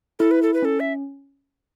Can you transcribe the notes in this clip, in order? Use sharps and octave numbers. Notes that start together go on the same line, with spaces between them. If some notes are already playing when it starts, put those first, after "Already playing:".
E4 A4
B4
A4
B4
C#4 A4
E5